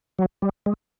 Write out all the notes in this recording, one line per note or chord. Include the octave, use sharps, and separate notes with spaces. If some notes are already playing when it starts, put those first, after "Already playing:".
F#3
G3
G#3